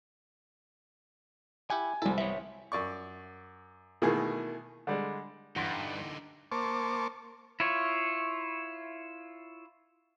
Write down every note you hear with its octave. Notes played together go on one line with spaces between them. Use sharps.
E4 G4 F#5 G#5
C2 G3 E4 A4
E3 B3 C#5 E5
F#2 D5 C#6
B2 D#3 E3 A3 A#3 G#4
D3 G3 G#3
G2 D3 E3 D#4 F#5 C6 A6 A#6
A#3 C5 A5 C#6 D6
E4 F4 C#5